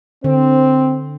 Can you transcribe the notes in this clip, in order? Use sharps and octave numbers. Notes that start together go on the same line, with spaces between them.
D3 C4 C5